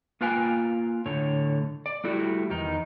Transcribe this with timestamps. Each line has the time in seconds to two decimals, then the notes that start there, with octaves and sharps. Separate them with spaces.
0.21 A#3 F4 B4 F5 G5 G#5
1.06 A2 D3 C#5
1.86 D5
2.04 G3 A3 E4 F#4 G4
2.50 E2 D#3 D#4